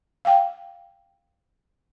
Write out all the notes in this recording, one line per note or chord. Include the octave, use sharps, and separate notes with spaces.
F5 G5